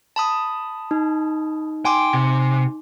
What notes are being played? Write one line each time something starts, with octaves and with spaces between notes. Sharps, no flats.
A5 B5 D#6
D#4
G5 G#5 C6 D6
C3